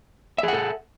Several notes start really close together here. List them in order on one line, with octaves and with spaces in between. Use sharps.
E5 G#4 F#5 A4